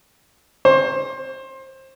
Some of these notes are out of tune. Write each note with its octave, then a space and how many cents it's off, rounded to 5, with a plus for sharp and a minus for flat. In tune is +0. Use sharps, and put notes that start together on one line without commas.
C5 +25